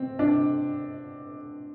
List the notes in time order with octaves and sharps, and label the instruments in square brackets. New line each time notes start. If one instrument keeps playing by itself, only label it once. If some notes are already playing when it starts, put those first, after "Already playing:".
Already playing: [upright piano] C4
D4